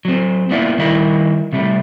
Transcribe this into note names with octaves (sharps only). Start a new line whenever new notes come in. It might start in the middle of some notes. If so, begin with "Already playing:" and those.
F#3 C4
A#3 B3 D4 E4 F4
D#3 G3 E4 A#4
C3 G3 A3